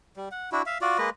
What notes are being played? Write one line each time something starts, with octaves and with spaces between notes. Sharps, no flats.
G3
F#5
D4 E4 F#4
E5 F5
F4 F#4 D5
G#3 A#3 B4 D#5